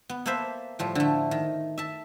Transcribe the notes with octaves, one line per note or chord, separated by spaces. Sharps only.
B3
A#3 A4 B4 C5 E5
A2 F3 G3
D3 A3
D#3
E5 A5